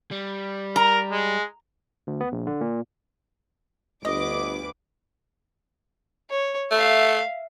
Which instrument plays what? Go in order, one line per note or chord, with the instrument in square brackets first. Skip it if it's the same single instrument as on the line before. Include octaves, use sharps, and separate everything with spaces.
[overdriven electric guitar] G3
[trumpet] A#4 [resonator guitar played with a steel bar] A#5
[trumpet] G#3
[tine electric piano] D2
B3
A#1
D3
A#2
[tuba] G1 [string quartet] D2 B4 [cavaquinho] D#5 [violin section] D6
[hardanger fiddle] C#5
[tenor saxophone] A3 [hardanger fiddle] E5 F5